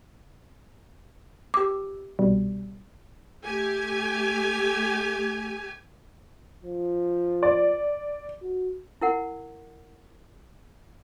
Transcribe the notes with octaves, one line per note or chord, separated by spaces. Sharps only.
G4 D6 E6
C2 B2 G3
A3 G4 G#5
F3
D5
F#4
E4 A#4 F#5